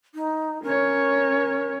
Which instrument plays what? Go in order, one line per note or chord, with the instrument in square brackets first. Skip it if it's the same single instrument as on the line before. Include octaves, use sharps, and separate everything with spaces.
[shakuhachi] D#4
[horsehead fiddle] C#4 C#5 [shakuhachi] A#4